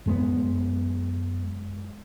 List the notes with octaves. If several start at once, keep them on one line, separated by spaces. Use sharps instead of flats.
F#2 G#3 B3